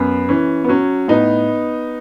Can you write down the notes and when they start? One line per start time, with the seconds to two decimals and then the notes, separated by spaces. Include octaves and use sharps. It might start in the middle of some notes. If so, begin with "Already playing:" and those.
Already playing: F#2 B3
0.29 E3 C#4
0.64 B3
0.69 F#3 C#4
1.08 A2 B3 D#4